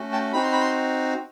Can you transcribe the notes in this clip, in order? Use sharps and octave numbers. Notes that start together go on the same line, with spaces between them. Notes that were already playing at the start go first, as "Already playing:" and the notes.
Already playing: A3 C#4 F#4
G5 A5
C4 D#4 F#4 B5
C6
B5
C6